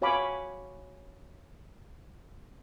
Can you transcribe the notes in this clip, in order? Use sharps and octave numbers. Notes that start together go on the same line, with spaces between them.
F#4 C#5 F5 G#5 B5 D6